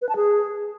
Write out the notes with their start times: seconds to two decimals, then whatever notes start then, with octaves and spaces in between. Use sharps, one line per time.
0.02 B4
0.09 A5
0.16 G#4